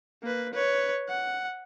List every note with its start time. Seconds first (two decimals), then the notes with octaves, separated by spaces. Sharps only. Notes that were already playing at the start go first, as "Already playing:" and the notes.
0.23 A#3 B4
0.53 B4 C#5
1.08 F#5